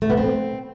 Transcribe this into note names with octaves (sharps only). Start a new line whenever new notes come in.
A3
B3
C4